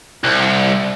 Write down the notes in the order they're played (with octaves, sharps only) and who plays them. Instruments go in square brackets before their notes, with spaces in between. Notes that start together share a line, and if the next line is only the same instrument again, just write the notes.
[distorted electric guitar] C2